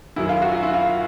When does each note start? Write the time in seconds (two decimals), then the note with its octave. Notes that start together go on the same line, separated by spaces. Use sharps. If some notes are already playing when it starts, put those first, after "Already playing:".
0.16 F#2 D#3 F#3 E4
0.29 F4
0.42 F#4
0.52 F4
0.63 E4
0.74 F4